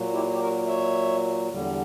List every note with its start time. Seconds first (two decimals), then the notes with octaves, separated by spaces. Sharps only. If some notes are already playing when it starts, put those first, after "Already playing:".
Already playing: A#2 F#3
0.13 E4 G4
0.32 G4
0.40 F#4 A#4
0.67 C#5 E5
1.49 E2 D3 G3